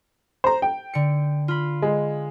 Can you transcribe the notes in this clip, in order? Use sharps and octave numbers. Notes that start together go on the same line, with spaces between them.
C5 A#5
G5
D3 C#7
F4 B5
G#3